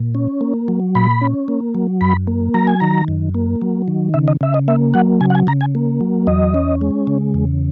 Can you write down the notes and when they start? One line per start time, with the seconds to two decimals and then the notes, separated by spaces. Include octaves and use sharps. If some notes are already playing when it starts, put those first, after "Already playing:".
Already playing: A#2
0.15 C#4
0.41 A#3
0.68 F#3
0.95 A#2 B5
1.21 C#4
1.48 A#3
1.75 F#3
2.01 F#2 B5
2.27 A#3
2.54 F#3 A#5
2.67 G#5
2.80 D#3 A#5
3.08 F#2
3.34 A#3
3.61 F#3
3.88 D#3
4.14 C#3 E5
4.28 D#5
4.41 C#3 E5
4.54 D#5
4.68 A#3 E5
4.94 F#3 F#5
5.21 C#3 G#5
5.30 F#5
5.35 G#5
5.47 C#3 A#5
5.61 G#5
5.75 A#3
6.01 F#3
6.27 E2 D#5
6.54 C#4
6.81 G#3
7.07 C#3
7.34 E2